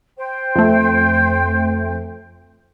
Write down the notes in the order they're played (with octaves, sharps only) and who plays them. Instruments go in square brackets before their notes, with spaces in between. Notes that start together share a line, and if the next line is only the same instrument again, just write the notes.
[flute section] C5 G5
[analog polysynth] F2 A3